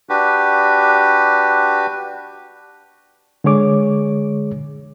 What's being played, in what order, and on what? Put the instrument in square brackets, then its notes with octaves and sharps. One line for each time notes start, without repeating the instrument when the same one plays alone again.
[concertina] D4 F#4 G4 B4
[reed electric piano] D3 G#3 G#4 C#5 D6